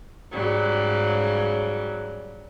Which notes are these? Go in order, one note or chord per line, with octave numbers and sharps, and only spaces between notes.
G#2 C#3 F#3 G3